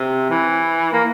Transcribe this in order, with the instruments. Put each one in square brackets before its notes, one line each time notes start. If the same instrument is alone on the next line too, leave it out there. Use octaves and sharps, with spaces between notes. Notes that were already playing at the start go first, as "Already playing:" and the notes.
Already playing: [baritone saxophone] C3
E3
A#3